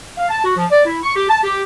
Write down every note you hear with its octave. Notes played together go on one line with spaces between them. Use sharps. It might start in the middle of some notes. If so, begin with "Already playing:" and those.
F5
A5
F#4
F3
D5
E4
C#6
G4
A5
G4